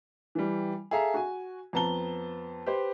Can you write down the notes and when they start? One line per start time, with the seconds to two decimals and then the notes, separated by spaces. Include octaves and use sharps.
0.35 E3 G3
0.91 G#4 A4 E5 F5 A#5
1.14 F#4 G#5
1.73 F2 B3 A5 A#5 G7
2.66 G4 B4 C5